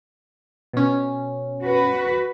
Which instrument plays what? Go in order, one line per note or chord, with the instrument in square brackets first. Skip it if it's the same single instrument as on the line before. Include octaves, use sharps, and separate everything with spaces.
[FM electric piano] B2 C#4
[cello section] F#4 B4